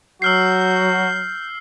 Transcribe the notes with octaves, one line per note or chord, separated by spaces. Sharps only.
F#3 F#4 E6 F6 G6 C7